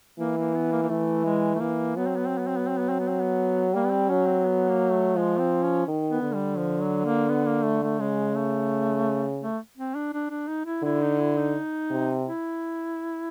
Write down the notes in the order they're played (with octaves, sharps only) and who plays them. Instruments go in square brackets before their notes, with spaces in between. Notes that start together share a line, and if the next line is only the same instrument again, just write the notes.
[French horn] E3 [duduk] A#3
[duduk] A#3
B3
A#3
A#3
[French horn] E3 [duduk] A3
[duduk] G#3
A3
[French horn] E3 [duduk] A#3
[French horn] F#3 [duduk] B3
[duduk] C4
B3
C4
B3
C4
B3
C4
B3
C4
B3
C4
B3
[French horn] G3 [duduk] A#3
[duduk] B3
C4
[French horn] F#3 [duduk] C#4
[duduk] C4
B3
A#3
A3
[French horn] F3 [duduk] G#3
[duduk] C4
C#4
[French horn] D#3
[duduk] B3
[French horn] D3
[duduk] G3
F3
F#3
A#3
B3
A#3
A3
A3
[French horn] C#3 [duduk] G#3
[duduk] A3
A3
C4
D4
D4
D4
D#4
E4
[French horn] D3 [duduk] E4
[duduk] D#4
E4
D#4
[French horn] C3
[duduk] E4